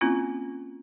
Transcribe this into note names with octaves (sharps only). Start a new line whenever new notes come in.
A#3 C4 C#4 E4 F4